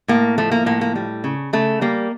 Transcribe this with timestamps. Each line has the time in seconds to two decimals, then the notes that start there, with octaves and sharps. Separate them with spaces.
0.08 A2 A#3
0.38 F3 A3
0.52 A#3
0.66 A2 A#3
0.81 A#3
0.95 G3
1.24 C#3
1.53 C#3 A3
1.81 G3 A#3